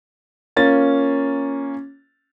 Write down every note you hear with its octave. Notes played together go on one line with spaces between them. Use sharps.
A#3 C#4 F4 A6